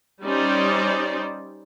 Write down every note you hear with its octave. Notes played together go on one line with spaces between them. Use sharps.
G3 C#4 D#4 C5 D5